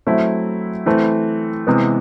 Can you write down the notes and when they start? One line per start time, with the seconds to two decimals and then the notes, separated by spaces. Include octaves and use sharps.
0.07 F#3 A3 C4 E4
0.86 E3 A3 C4
1.67 C3 E3 G#3 B3